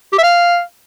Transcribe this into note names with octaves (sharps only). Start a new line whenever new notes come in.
G4
E5
F5